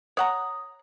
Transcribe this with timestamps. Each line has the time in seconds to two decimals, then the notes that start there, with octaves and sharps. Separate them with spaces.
0.17 C#5 F#5 A#5 D#6